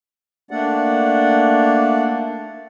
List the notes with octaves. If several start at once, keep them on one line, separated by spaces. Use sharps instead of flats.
A3 A#3 D4 D5 F#5